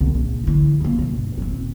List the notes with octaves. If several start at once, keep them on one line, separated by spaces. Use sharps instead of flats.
C2
A#1
D3 E3
C#3 A#3
G2 B2
D#1 C4